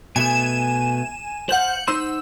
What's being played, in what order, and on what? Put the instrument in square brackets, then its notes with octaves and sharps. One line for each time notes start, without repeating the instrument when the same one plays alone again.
[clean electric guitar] B2 A3 B3 [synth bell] G#5 E7
[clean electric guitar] C5 F5 [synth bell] F#5 G6 F#7
[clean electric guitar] D#4 C5 C6 [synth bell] E6